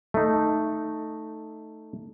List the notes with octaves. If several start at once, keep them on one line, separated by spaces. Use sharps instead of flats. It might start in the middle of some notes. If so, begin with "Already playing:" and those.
A3 D#4